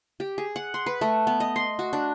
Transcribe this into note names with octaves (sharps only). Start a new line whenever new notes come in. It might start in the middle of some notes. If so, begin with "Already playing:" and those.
G4
G#4
F#5
C6
B4
A3
B3
D#5
C6
F#4
D4